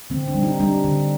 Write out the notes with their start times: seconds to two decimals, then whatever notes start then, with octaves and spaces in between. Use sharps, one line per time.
0.10 D3 C4
0.28 D4
0.35 G3
0.43 D#4
0.60 G3 D4
0.84 D3